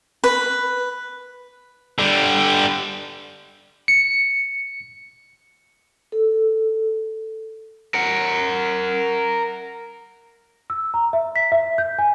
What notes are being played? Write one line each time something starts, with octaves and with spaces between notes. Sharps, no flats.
B4
D3 G3
C#7
A4
A#4 F#5
E6
A#5
E5
B6
E5
G6
G#5